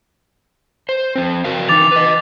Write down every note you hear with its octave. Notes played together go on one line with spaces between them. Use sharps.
C5
F3 C4
F#4 A#4 F5
E3 D#4 D6 A6 F7
B4 D#5